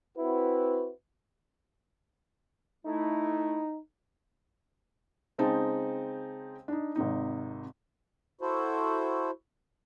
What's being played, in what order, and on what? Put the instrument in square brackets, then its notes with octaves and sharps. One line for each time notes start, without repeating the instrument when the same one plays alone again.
[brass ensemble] C4 E4 F#4 B4
[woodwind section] A3 E4 [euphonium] D#4
[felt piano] C#3 G#3 C4 D#4 G5 A5
D4 D#4
G#1 C3 D#4
[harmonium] E4 F#4 A4 C5